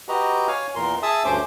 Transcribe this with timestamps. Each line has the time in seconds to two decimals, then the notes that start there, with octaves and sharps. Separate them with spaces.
0.09 F#4 G4 B4 D#5 A#5
0.48 C#5 F5 G#5 F6
0.75 E2 A#2 A#4 C6
1.03 G#4 E5 A5 D#6 E6
1.25 D2 G2 A3 C#4 C5 D6